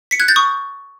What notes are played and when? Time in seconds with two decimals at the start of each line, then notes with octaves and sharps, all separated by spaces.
0.11 B6 C#7
0.20 F#6 G#6
0.28 G6 A6
0.36 C#6 D#6